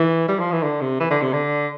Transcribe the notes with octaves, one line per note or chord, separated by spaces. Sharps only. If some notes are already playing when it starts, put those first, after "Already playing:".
Already playing: E3
G3
F3
E3
D3
C3
E3
D3
C3
D3